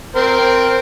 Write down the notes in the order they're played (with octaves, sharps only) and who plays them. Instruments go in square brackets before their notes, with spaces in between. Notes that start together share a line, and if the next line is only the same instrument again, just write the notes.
[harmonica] C4 A#4 C5